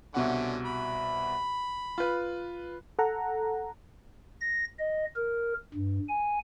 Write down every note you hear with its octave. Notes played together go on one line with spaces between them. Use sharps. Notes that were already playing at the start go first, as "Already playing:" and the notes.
C2 B2 D3 C#4 F#5
B5
F4 B4
A4 F#5 A#5
A#6
D#5
A#4
G2
G#5